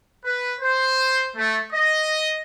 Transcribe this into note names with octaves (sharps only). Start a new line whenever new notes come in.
B4
C5
A3
D#5